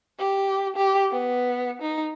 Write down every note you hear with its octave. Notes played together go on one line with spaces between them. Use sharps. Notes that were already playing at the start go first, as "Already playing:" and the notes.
G4
G4
B3
D#4